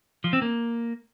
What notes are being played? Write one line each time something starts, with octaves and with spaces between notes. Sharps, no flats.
F3
C4
A#3